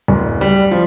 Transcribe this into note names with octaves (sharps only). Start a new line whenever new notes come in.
D1
G3
F3